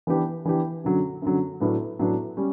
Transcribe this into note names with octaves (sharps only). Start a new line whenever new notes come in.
E3 B3 D4 G4
E3 B3 D4 G4
F#2 D3 F#3
F#2 D3 F#3
A2 F#3 B3 D4
A2 F#3 B3 D4
G3 C#4